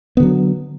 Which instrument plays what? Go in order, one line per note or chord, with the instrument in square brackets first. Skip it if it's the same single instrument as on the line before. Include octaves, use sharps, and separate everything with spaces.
[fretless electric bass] B3
D3
F#3